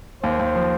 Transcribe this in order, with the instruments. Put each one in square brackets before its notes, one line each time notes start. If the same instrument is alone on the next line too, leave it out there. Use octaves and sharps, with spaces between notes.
[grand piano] D#2 [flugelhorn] C5
[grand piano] D#2
F3